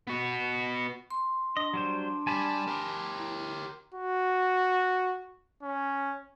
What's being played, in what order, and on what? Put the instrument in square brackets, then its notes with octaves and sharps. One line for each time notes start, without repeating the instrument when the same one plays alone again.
[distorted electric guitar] B3 F#4
[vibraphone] C6
[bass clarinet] D4 [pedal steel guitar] D#5
[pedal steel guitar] F#3 G3 C5
[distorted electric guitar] G3 D5 [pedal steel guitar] G#5 A5 B5
[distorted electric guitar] G4 A#4
[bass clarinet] E4
[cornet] F#4
C#4